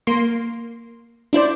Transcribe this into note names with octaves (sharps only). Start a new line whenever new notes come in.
A#3 C6
D4 E4 C5 D5